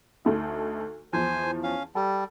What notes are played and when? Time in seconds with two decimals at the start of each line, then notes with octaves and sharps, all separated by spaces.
0.25 D2 A3 D#4
1.13 E2 E3 F3 C5 G#5
1.64 C#4 F5
1.95 G3 A4